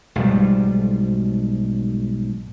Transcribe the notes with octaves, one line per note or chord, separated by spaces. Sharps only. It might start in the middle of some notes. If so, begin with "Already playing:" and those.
B1 G#2 F3 G3